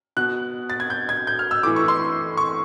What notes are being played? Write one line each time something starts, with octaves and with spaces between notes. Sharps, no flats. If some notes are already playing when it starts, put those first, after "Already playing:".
B2 F#6
A6
G#6
G6
G#6
G6
F6
E6
A2 E3 D6
C#6
C6
C#6